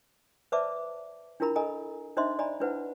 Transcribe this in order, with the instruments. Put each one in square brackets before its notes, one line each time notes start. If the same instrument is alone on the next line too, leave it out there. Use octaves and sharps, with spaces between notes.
[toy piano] B4 C5 D5 E5 A5 D6
D4 E4 F4 A#4 A#5 B5
A4 D#5 G#5 A#5
D4 D#4 C5 D#5 E5 C6
D5 D#5 G#5 A#5 B5
D4 E4 B4 C5 F#5